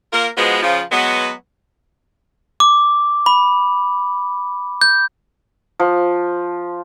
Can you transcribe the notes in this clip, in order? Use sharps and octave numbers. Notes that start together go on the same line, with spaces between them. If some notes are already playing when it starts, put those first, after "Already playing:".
A#3 F4 A#4
B2 F3 G#3 B3
C#3 F3
F#3 G#3 B3
D6
B5
G6
F3